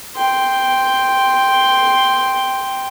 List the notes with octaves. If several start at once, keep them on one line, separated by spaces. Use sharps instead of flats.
G5 C6